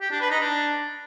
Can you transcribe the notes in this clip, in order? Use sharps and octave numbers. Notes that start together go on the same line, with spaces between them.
G4
D4
B4
D#4
D4